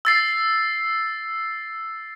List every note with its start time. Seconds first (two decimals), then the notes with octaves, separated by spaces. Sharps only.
0.05 E6 A6 C7